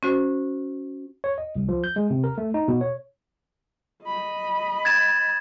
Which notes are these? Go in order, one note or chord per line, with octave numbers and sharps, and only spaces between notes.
C#4 F#4 C5
C#5
D#5
C2
F3
G6
G#3
C3
A#4
A3
D#4
B2
C#5
D#5 B5
G#6 A6 E7